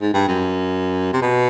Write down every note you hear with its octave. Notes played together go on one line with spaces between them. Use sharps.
G#2
G2
F#2
C3
B2